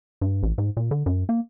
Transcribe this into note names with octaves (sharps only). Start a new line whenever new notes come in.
G2
A1
G#2
A#2
D3
F#2
A#3